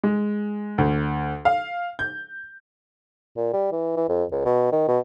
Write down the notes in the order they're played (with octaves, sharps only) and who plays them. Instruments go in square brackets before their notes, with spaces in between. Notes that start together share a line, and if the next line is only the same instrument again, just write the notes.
[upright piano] G#3
D2
F5
G6
[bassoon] A#2
G3
E3
E3
F2
C#2
B2
D#3
B2